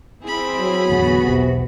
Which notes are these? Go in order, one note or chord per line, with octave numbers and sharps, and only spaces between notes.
C4 E4 G#4 B5
F#3
E2 A2 D3 B3 F#4
E1 B1 C3